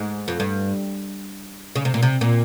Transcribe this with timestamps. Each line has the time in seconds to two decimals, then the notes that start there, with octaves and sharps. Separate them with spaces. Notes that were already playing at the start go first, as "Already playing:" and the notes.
Already playing: G#2
0.28 F2
0.40 G2
1.76 C#3
1.85 C3
1.94 A#2
2.02 C3
2.21 A#2